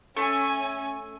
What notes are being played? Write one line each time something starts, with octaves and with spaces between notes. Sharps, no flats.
A3 C#4 G#5